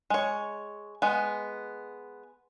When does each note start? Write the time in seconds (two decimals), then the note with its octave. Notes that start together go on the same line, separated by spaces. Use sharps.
0.10 G#3 C#5
1.02 G#3 B3